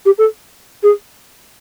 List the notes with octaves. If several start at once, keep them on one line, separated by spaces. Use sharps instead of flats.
G4
A4
G#4